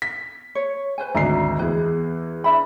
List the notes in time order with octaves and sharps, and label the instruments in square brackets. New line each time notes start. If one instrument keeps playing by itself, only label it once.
[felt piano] B6
[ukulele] C#5
B4 C5 G#5
[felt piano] G#1 D2 C7 [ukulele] D5 A#5
[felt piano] E2 G#4 [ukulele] B4
[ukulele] D4 E5 B5